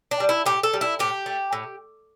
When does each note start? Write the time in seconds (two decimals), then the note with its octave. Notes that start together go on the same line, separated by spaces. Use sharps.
0.11 D4
0.20 G3
0.29 E4
0.46 A2 G4
0.63 A4
0.73 G3
0.81 E4
0.99 A2 G4
1.26 A3
1.53 A2